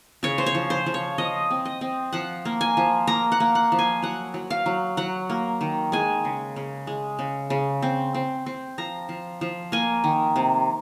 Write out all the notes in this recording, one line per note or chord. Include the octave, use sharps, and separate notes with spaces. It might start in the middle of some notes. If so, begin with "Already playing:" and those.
C#3 C#5
C5
C#5
F3
C5
F3
C#5
F3 D#5
C4
D#5
C4
F3 F#5
A#3
G#5
F3
A#3 A#5
F#5
A#3
F#5
F3
G#5
F#3 F#5
F#3
F5
F#3
F#3 F#5
A#3
D#3
G#3 G#5
C#3
C#3
G#3
C#3
C#3
C4
C4
C4
F3 A#5
F3
F3
A#3 G#5
D#3
C3